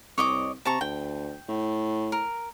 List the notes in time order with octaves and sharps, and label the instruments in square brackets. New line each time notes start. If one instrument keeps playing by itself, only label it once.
[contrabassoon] C2 [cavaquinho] C#5 D#5 D6
[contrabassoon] C3 [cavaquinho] A5 A#5 C#6
[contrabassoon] D2 [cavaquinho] G5
[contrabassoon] A2
[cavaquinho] A#4